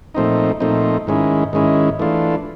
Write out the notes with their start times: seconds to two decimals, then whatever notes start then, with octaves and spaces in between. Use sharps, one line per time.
0.15 A#2 F3 A3 C4 D#4
0.60 A#2 F3 A3 C4 D#4
1.07 G#2 D#3 G#3 C#4 E4
1.53 G#2 D#3 G#3 C#4 E4
1.99 E3 A3 D4 F4